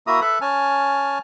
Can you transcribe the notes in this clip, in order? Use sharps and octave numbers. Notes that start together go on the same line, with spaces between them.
A#3 E4 F#4 E5 A#5 D#6
A4 B4 E5 B5
C#4 G#5 A5 F6